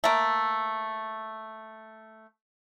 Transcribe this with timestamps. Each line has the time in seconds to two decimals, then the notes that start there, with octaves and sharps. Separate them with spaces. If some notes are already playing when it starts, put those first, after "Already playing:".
0.04 A3 A#3